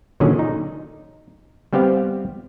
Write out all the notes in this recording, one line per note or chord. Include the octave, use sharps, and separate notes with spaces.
A#2 D3 D#3 F#3 C#4 G#4
D#4
G3 B3 C4 G4 F5